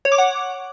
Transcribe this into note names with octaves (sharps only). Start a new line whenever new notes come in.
C#5
D6
F#5